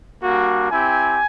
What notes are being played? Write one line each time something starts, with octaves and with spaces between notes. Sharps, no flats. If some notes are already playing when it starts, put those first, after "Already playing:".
G3 A#3 D4 F#4
C4 E4 G4 G#5